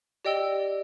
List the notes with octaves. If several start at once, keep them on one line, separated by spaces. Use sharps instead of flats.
G4 D5 D#5 G5 E6 G7